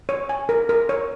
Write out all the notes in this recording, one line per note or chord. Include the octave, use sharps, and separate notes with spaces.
C#5
G#5
A#4
A#4
C#5